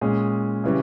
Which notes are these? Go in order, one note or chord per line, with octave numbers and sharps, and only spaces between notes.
A#2 G#3 C#4 G#4
C#3 E3 G3 C#4